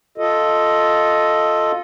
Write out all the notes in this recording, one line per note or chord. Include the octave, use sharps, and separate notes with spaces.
F4 A4 D#5